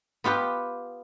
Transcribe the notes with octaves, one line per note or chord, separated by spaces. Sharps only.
B3 F4 G4 B4